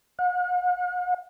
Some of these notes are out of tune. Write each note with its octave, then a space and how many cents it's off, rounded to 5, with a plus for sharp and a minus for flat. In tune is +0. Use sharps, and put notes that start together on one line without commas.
F#5 -45